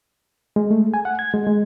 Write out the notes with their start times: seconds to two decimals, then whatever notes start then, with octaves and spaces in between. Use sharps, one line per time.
0.56 G#3
0.71 A3
0.94 G#5
1.05 F#5
1.19 G#6
1.34 G#3
1.47 G#3